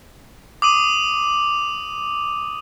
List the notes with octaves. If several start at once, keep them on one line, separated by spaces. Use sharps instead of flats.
D6 D#6 D#7